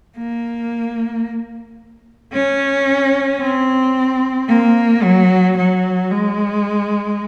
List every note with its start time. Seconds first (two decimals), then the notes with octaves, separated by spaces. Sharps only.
0.17 A#3
2.33 C#4
3.41 C4
4.49 A#3
5.03 F#3
5.57 F#3
6.11 G#3